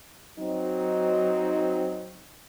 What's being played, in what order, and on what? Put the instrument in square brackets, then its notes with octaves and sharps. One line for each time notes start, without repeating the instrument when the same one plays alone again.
[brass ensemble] F#3 C4 D#4